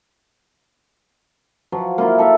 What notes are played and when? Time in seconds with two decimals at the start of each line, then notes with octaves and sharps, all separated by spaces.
1.72 F3 F#3
1.98 A#3 E4 F4 A#4
2.18 A4 A#4 E5